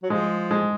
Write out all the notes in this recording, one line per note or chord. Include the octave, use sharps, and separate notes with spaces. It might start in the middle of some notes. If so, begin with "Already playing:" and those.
F#3
F3 G#3
G#3